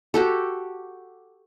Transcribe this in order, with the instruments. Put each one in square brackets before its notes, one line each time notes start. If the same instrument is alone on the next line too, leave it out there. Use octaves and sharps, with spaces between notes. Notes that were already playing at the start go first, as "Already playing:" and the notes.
[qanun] F#4 G4 A4